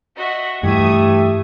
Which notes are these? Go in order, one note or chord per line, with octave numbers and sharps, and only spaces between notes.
F#4 D#5 E5
G2 E3 A3 G4 E5 D#6 G#6